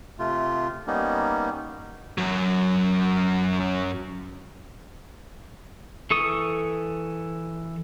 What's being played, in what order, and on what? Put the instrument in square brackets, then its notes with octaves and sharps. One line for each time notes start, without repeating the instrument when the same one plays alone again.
[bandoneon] C3 A3 F4
G3 A#3 B3 C#4 D#4
[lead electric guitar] F#2 F#3
[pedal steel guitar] E3 A4 C#6 D#6